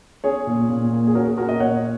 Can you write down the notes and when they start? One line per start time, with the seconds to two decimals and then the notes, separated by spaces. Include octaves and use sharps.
0.24 C#4 G#4 C#5
0.47 A#2
0.70 A#2
0.92 A#3
1.07 G#4
1.15 C#4 F#4 A#4
1.27 G#4
1.37 A#2 F#4 A#4
1.49 A#4 D#5
1.60 A#2 C#5 F#5